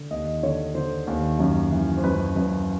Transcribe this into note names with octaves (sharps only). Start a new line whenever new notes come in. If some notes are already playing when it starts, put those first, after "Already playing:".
Already playing: D3
D#2 D#5
D3 C#5
D3 C5
D#2
F#2
E3
C5
F#2 B4
F#2 B4